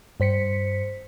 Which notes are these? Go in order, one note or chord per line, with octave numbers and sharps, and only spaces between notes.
G2 C5 B6 C#7